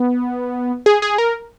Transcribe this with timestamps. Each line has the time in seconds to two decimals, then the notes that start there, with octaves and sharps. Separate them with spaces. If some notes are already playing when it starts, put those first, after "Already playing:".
Already playing: B3
0.86 G#4
1.02 G#4
1.18 A#4